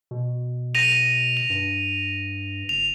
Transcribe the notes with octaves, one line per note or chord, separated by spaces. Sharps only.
B2
A#6 D#7 F7
F7
G2
F#1 F7